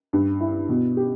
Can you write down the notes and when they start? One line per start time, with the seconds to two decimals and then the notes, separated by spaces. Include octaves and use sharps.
0.13 G2
0.40 E4
0.69 B2
0.97 G4